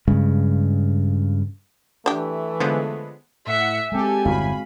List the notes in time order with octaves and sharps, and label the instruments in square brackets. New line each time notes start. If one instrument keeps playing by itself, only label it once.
[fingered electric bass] G2 C#3 G#3
[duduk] E3 [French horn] A3 [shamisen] D4 G4
[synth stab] D3 G#3 B3 [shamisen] F3
[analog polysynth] A2 F#5 C#7 [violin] E5
[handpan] G#3 C4 [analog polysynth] G4 A4 [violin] G#5
[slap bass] G1 E2 A2 [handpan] F#4 F5 [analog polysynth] B5